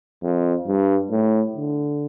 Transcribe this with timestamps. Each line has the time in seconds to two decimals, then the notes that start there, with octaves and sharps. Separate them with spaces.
0.23 F2
0.68 G2
1.11 A2
1.56 D3